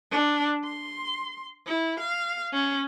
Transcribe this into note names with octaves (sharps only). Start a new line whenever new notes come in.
D4
C6
E4
F5
C#4